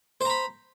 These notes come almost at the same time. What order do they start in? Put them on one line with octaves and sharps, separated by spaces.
C5 A#5 B5